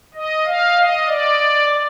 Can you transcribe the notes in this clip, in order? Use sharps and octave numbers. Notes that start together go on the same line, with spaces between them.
D#5
F5
D#5
D5